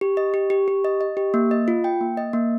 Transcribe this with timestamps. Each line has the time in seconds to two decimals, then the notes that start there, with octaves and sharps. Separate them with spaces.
0.01 G4
0.17 D#5
0.34 G4
0.50 G4
0.68 G4
0.85 D#5
1.01 D#5
1.17 G4
1.34 A#3
1.51 D#5
1.68 F4
1.84 G5
2.01 A#3
2.17 D#5
2.33 A#3